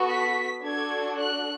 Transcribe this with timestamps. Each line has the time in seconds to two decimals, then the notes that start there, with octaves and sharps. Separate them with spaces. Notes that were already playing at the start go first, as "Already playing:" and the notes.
Already playing: B3 F#4 A4
0.10 B6
0.63 D4 F#4 A4 G#6
1.17 F#6